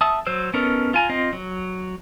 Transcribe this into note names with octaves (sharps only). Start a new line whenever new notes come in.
E5 F#5 A5 D#6 E6
F#3 C5 E6
B3 C#4 D#4 A4 A#4
F4 G#5 A#5
C4 F4 D#5
F#3